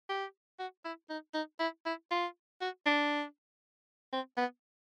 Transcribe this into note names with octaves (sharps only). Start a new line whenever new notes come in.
G4
F#4
E4
D#4
D#4
E4
E4
F4
F#4
D4
C4
B3